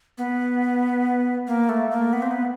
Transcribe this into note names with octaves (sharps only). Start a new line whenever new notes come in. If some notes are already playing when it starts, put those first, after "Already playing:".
B3
A#3
A3
A#3
B3
C4
B3